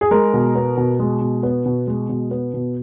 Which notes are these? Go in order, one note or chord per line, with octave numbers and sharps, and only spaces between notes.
G#4
G#3 A#4
B2
B3
B2
G#3
B2
B3
B2
G#3
B2
B3
B2